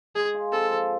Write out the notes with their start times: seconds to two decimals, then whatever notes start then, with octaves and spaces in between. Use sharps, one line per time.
0.15 G#3 G#4
0.34 F4
0.52 C4 A4
0.71 F3